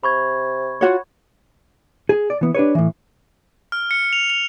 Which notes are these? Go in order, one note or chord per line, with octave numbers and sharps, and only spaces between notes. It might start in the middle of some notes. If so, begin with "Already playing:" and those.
C3 B5 C#6 G#6
F4 F#4 C#5
G#4
D5
E3 B3
D4 G4 B4 C#5
A2 E3
F6
C#7
F7
F7